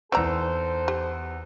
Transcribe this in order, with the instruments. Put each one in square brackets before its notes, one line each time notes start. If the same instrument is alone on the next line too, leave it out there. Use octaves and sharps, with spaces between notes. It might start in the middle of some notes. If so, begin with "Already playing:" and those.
[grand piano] E2 E6 [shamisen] C4 D5 A#5 [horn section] D#4 A4 C5
[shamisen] G4